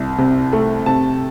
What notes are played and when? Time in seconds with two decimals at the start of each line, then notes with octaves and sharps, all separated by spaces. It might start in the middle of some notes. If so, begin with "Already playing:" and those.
Already playing: C2
0.18 C3
0.53 A3
0.86 C3 A5